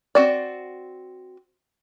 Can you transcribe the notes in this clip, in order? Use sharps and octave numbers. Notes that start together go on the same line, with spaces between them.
C4 F#4 D5